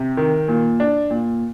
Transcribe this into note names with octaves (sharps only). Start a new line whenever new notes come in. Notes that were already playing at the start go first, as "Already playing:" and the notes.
Already playing: C3
D#3
A#2
D4
A#2